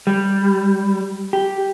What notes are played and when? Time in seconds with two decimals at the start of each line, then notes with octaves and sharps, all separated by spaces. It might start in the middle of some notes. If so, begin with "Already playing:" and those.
0.07 G3
1.33 G4